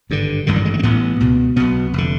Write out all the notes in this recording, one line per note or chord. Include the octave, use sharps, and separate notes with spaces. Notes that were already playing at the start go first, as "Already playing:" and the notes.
G#1 G2 D3
A1 G2 D3 D#3
G3
G#3
A3
C4
A1 A2 B3
C#2 B2
B1 B2 B3
F1 D3